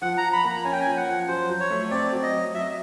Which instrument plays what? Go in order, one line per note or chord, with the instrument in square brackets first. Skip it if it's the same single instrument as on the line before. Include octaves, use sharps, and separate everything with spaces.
[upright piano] F3 [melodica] F#5
[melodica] A#5
[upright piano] F3
[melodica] B5
[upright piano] A#3
[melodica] A#5
[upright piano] C#4 [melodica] G#5
[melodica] G5
[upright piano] F3 [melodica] G#5
[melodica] F#5
[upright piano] F3
[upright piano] F#3 [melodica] C5
[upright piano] F#3
[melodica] C#5
[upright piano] A3
[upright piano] C4 [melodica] D5
[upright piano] F#3
[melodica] D#5
[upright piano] F#3
[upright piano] F#3 [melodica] E5
[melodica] D#5